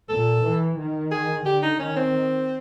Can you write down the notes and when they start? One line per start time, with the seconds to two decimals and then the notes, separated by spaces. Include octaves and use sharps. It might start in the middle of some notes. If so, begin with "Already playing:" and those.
0.09 A#2 A4
0.43 E3
0.78 D#3
1.11 G#4
1.46 D3 G4
1.63 D#4
1.80 D#3 C#4
1.97 C4